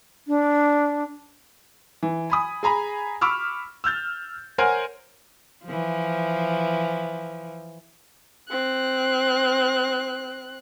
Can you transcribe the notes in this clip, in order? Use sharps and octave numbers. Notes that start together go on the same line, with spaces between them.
D4
E3
G#5 B5 D#6
G#4 G#5 A#5 B5
B5 C#6 D6 E6 F6
E6 F6 G6 A6
A#4 C5 C#5 F#5 G#5
E3 F3
C4 F#6